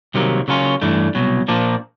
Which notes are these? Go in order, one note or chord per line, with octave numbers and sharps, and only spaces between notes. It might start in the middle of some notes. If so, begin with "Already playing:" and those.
C2 C3 D#3 F#3 A#3
C#3 F#3 A#3 C#4 F4
G2 E3 A3 D4
C2 B2 F#3
A#2 F3 A#3 D4